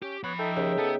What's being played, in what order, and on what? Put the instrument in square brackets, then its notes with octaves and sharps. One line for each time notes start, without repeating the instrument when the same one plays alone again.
[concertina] C#4 [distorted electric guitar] G4
[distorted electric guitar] F3 B5 [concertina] B3 C#5 F#5
[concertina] D#4 E5 G5 [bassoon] A4
[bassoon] D#2 [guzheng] C#3
[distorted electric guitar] B3 [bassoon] A4